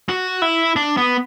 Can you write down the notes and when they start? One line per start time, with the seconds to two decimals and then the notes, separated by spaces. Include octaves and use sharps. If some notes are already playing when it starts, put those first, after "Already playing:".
0.09 F#4
0.42 E4
0.76 D4
0.97 B3